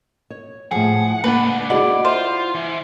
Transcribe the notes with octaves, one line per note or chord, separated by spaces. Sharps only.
C#5
A2 F3 G#4 F#5
C#2 A#3 D4 B4 F#5
E4 F#4 G#4 D5 D#5 F#5
F4 C5 E5 C6
E3